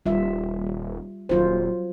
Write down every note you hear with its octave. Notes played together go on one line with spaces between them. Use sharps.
D#1 G3 F4 E5
D#1 F#3 F4 C5